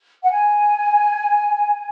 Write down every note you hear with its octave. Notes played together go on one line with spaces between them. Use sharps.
F#5
G#5